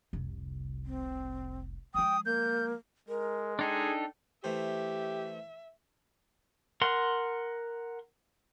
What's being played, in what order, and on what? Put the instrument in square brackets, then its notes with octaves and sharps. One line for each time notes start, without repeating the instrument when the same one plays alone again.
[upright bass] F1 C2
[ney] C4
[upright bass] F3 G#3 [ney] G5 [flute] D#6
[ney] A#3 [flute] G6
[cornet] G#3 [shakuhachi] A#4
[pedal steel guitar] D4 D#4 A4 [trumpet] G#4 [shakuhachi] G5
[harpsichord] E3 A3 C5 [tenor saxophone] G4 [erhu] E5
[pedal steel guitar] A#4 F#5 C6